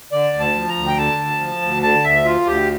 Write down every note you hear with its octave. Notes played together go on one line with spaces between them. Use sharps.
D3 D5
D2
A5
F3
A#5
D2
G5
D3 A5
D2
F3
D2
D3 A5
D2 E5
F3 F4
D2 G4